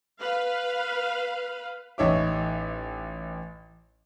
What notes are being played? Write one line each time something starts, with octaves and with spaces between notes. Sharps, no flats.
B4 F5
A1 D#4 C#5 E5 D6